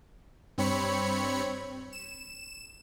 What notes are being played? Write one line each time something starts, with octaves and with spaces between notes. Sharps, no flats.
G2 C4 C#5 B5 C#7
E7